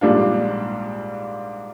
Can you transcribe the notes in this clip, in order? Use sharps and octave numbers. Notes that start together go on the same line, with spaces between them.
A#1 G#2 G3 D4 F4